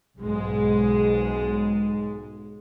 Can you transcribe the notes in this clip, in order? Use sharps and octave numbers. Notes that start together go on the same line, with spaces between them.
B1 G#2 G#3